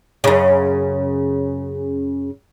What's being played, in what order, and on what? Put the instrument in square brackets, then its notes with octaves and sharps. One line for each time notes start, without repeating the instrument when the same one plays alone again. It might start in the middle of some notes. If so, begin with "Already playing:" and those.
[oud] F#2 C#3